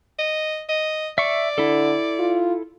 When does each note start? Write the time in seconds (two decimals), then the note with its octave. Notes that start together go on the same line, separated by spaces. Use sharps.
0.19 D#5
0.69 D#5
1.18 D5 E5 C#6
1.58 D3 E4 A4
2.19 F4